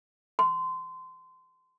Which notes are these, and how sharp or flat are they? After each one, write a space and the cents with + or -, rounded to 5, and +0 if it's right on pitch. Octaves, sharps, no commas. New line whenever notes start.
C6 -25